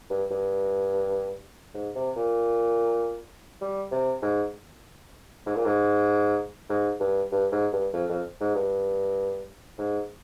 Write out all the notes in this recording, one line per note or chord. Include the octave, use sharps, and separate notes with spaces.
G2
G2
G#2
C3
A#2
G3
C3
G#2
G#2
A#2
G#2
G#2
G2
G2
G#2
G2
F2
F2
G#2
G2
G#2